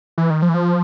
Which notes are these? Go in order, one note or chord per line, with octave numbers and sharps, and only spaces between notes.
E3
D#3
F3
E3
F3